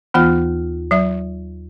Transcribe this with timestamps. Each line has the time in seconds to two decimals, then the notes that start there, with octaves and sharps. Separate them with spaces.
0.14 D#2 E3 B3 F4 F6
0.91 F#3 E5